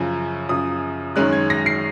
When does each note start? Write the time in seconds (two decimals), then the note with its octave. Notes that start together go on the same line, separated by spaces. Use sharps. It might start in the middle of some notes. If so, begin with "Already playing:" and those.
Already playing: F#2 C#3 F3
0.49 F#2 C#3 F3 D#6
1.16 F#2 D#3 G#3 C#4 F#6
1.33 G#6
1.50 A#6
1.66 C7